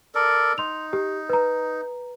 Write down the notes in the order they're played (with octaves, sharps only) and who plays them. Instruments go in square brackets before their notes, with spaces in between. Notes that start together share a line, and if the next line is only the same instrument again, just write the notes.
[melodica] A4 A#4 D5
[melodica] D#4 [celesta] C6 F7
[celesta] G4
B4 A#5